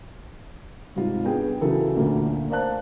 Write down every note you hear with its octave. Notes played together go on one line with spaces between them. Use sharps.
G#2 C3 G3 F4
B3 D4 G#4 G5
C#3 E3 F#3 A4 A#4
D2 A#2 D3 A3 A#3
A#4 C5 D5 F5 A5 F#6